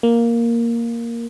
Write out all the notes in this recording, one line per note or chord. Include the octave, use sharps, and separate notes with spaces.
A#3